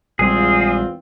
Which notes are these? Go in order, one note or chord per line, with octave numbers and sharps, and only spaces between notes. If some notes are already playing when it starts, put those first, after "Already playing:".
A#1 E2 G3 G#3 C4 F4 G#4